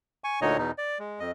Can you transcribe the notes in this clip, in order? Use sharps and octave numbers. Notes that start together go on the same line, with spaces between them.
G#5 C#6
D2 A#2 D3 D#4 C#5 D#5
E2 B2 D#4
D5
G#3
F2 D#5